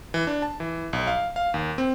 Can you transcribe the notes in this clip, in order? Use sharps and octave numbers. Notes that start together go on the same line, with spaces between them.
E3
D4
A5
E3
B1
F5
F5
D#2
C4